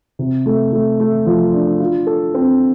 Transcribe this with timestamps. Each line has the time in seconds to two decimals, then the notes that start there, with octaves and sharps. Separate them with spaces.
0.19 C3
0.46 A3
0.72 A3
1.00 A3
1.26 F3
1.53 D4
1.80 F4
2.07 A4
2.34 C4